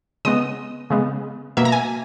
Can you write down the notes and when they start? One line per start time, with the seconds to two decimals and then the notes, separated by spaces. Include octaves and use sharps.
0.25 C#3 G#3 B3 D#5
0.90 C#3 G#3 B3
1.57 B2 A#3 E5
1.65 A#5
1.72 G#5